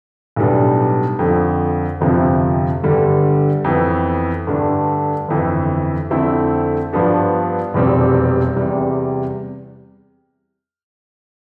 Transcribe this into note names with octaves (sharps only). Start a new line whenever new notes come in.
B1 A2 G3 B3 D4
F2 D3 F3
G1 F2 C3 F3
G1 G2 D3 G3
F2 E3 B3
G2 D3 A3 D4
G1 F2 E3
F2 D3 A3 C4 E4
G2 F3 B3 D4
F1 E2 B2 G3 C4
E2 C3 G3